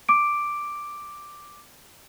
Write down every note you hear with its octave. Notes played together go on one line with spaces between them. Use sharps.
D6 D7